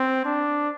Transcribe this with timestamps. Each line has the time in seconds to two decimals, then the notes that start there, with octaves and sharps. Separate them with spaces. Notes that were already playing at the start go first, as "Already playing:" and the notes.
Already playing: C4
0.25 D4